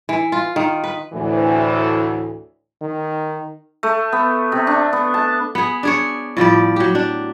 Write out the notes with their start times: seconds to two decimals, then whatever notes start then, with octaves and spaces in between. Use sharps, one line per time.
0.09 E3
0.32 F4
0.56 D#3
0.84 B4
1.13 D2 A2 E3
2.81 D#3
3.83 A3
4.12 B3
4.52 C3
4.67 D4
4.93 B3
5.14 A5
5.55 B3 G#4
5.83 D4 G#4 C#5
6.37 A2 F3 G3 D5
6.76 F#3 G4
6.95 D4